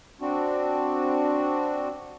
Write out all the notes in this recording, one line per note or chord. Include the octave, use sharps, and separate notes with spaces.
C4 D4 F#4